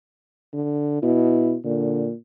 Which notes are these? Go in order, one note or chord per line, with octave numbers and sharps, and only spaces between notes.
D3
B2 E4
A#2 D3